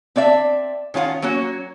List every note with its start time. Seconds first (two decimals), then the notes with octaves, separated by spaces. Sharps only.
0.16 C4 D4 D5 E5
0.94 D#3 C#4 F4 B4 F#5
1.22 F#3 A#3 C#4 F#4